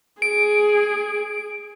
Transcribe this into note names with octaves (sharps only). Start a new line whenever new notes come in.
G#4 D7